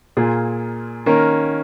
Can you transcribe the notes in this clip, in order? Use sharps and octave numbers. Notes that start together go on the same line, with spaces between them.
A#2 A#3 F4 G#4
D#3 A#3 C#4 A#4